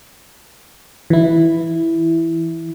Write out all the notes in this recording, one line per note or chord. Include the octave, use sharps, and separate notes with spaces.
E3 E4